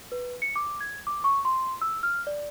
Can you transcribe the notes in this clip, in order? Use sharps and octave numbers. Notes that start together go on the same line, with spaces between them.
B4
C#7
D6
G#6
D6
C#6
C6
E6
F6
D5